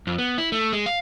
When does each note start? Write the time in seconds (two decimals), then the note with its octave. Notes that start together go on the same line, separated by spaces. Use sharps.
0.07 F2
0.18 B3
0.38 E4
0.52 A3
0.73 G#3
0.86 F5